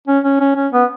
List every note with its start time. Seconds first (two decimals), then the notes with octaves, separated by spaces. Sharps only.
0.08 C#4
0.24 C#4
0.41 C#4
0.56 C#4
0.73 B3